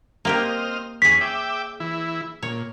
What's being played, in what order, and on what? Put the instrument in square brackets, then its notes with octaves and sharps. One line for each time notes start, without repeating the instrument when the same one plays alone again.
[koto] A#3 G4 A#4 [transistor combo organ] C4 D#5 F6
[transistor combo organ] E2 C#4 [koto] G#4 C#5 [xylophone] B6
[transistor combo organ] E5 G5 D6
E3 E4
[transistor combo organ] A#2 [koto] C#5